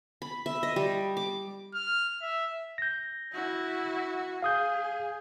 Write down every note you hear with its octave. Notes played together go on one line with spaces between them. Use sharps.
B5
E5
D#5
G3
D6
F6
E5
G6 A#6
E4 F#4
G#4 F5 D#6 G6